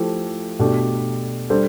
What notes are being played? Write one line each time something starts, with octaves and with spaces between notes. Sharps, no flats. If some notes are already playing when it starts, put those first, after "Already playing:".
Already playing: F3 A3 E4 G4
B2 A3 D4 G4
G3 D4 A4 C5